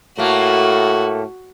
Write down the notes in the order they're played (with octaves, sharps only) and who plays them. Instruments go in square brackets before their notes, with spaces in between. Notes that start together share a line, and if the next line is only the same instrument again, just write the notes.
[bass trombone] A2 [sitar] A3 A#3 [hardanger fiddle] F#4